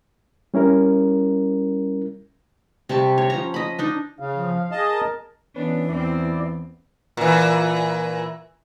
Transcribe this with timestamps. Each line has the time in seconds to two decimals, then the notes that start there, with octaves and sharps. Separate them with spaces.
0.54 G3 C#4 E4 A#4
2.89 C3 G3 A5 C#6
3.18 C#5
3.30 F3 C#4 A#5
3.54 D#5 B5
3.79 D4 D#4 D#5
4.20 C#3 F5
4.33 F3
4.71 G#4 D#5 A5
4.90 A#4
5.56 E3 B3 C#4 D4 B4
5.89 E2 C4 E4 D5
7.17 A#2 E3